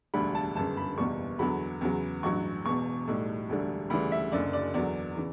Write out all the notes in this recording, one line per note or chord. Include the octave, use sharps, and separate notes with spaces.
E1 D2 D3 G3 B5
A5
G1 F#2 C#3 A5
B5
F#1 E2 B2 G3 C#6
E2 D3 F#3 B5
E2 C#3 F#3
A1 G2 F#3 C#6
E1 E2 B2 C#6
B1 A2 G3
E1 D2 D3 G3
D2 C#3 E3 G3 B5
E5
F#1 F#2 D3 D5
D5
E2 D3 F#3 D5
C#3 E3